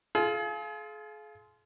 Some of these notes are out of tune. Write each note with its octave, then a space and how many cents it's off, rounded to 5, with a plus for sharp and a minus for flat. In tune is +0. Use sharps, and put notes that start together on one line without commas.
F4 -10 G#4 +40